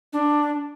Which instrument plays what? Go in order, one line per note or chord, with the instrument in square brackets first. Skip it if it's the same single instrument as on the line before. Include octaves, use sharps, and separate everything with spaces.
[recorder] D4